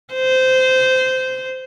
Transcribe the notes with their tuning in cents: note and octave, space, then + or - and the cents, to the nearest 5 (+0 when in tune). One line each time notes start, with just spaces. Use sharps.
C5 -15